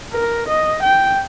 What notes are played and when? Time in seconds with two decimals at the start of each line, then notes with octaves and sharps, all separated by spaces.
0.13 A#4
0.49 D#5
0.83 G5